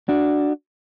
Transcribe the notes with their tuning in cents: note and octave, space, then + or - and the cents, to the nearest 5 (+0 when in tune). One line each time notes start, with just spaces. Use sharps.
D4 +0 F#4 +5